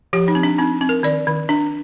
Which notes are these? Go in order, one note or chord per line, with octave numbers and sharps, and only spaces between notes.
F3 G4
D#4
C4
D4
C4 D#4
C4
A#4
D#3 D5
D#3
D4